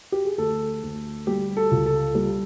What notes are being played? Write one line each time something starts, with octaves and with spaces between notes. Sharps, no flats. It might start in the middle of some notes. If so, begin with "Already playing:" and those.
G4
G#4
D2 A4
D2
G3 G4
A4
C#2
A4
G3